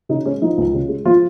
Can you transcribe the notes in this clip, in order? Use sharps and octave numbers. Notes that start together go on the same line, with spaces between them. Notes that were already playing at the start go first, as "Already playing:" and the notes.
C#3 D#4
G#3 C#4
F3 D#4
C#2
C#3
G#3
F3 F4